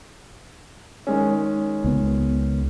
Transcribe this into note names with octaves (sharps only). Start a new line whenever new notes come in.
D#3 G#3 C#4
C#2 B3